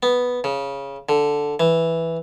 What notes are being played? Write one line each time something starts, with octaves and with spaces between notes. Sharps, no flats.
B3
C#3
D3
E3